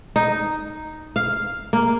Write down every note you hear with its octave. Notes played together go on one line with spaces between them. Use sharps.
D#4
F5
A#3